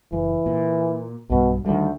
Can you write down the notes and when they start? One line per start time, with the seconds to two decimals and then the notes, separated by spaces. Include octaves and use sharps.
0.12 F#1 E3
0.46 A#2
1.30 B1 G2 B2
1.66 D2 D#3 G3